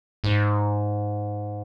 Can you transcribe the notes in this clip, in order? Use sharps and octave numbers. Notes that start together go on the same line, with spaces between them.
G#2